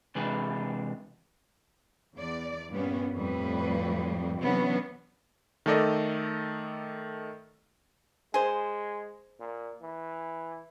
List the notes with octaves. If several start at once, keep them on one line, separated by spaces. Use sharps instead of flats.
C3 E3 G#3 D4 G#4 B4
E2 D5
G2 A#2 G3 B3 C#4
F2 A2 G3 B4
C3 E3 F#3 B3 C#4 D4
D#3 A3 A4 D5 D#5
G#3 G#4 C5
A#2
E3